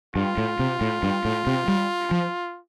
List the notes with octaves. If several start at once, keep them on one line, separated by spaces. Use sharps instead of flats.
G2 F4
A2
C3
A2
G2
A2
C3
G3
F3